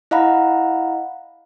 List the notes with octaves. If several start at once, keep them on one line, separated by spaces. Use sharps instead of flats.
E4 D#5 F5 F#5 A#5 B5